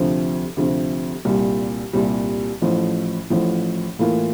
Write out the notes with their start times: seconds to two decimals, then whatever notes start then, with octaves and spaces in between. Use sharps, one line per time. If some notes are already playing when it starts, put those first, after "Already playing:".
Already playing: D2 C3 F3
0.57 D2 C3 F3
1.25 C2 A#2 G3
1.93 C2 A#2 G3
2.62 A1 A2 F3
3.30 A1 A2 F3
3.99 A2 E3 A#3 F4